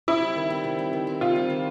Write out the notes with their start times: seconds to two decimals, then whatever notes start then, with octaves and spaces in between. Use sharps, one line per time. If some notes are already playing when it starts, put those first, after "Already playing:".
0.08 C3 E4
0.22 G3
0.36 D#3
0.50 C4
0.64 C3
0.79 G3
0.93 D#3
1.07 C4
1.21 C3 F4
1.36 G3
1.50 D#3